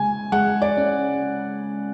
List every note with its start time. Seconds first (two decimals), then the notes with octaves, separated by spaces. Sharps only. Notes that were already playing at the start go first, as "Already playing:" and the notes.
Already playing: C#3 G#3 G#5
0.32 G#3 F#5
0.62 D5
0.78 C#4